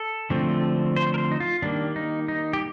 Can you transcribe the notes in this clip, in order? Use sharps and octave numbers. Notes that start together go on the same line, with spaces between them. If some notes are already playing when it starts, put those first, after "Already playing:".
Already playing: A4
D3 F3 A3 C4
C5
A#4
C5
D#4
F4
D#3 G3 A#3 D4
D#4
D#4
G4